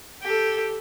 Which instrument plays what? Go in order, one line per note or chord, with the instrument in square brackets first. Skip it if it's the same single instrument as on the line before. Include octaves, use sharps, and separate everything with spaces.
[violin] G4 A4